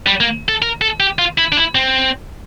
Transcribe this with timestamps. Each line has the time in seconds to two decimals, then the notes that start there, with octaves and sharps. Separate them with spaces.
0.07 G3
0.20 A#3
0.48 A4
0.62 A#4
0.81 A4
1.00 G4
1.19 F4
1.38 E4
1.52 D4
1.57 E4
1.75 C4